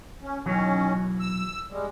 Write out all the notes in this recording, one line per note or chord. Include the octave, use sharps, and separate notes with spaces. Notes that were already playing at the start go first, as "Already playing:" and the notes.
C#4
B2 D#3 E3 F#3 C#4
E6
G3 G#3